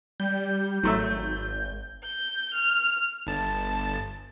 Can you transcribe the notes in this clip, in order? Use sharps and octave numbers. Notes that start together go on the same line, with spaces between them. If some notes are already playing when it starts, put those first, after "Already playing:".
G3 G6
G#1 F#3 A3 E5
G6
F6
G1 A5